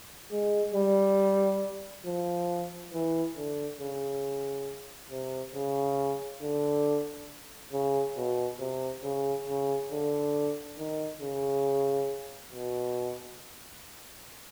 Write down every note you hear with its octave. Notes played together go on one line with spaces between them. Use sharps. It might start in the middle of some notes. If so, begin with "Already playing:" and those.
G#3
G3
F3
E3
D3
C#3
C3
C#3
D3
C#3
B2
C3
C#3
C#3
D3
D#3
C#3
B2